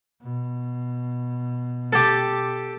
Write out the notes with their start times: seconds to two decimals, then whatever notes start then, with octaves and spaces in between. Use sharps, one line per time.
0.23 B2
1.93 G4 A4